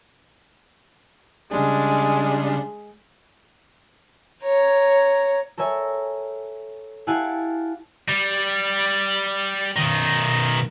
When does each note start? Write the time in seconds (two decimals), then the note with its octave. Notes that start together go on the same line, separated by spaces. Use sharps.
1.51 C#3 G3 G#3 D4
4.44 C#5 A#5
5.58 A4 A#4 C#5 E5 G#5
7.07 E4 G4 F5 F#5 G#5 A5
8.08 G3
9.76 B1 D#3